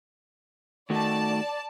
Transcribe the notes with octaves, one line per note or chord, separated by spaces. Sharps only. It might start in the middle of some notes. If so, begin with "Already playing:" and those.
D#3 A3 F#4 D5 A5